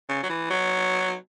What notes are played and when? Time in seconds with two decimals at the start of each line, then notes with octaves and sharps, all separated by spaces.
0.09 C#3
0.23 F#3
0.30 E3
0.50 F#3